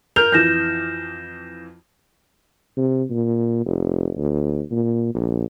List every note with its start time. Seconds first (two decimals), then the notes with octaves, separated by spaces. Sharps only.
0.16 A#4 F6 G6 F7
0.32 F2 E3 G6 A#6 E7
2.77 C3
3.10 A#2
3.66 F1
4.16 D2
4.71 A#2
5.14 A#1